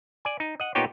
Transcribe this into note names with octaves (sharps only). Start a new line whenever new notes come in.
D5 G#5
D#4
D#5 F#5
A#2 B3 D#4 G4 C#5 G5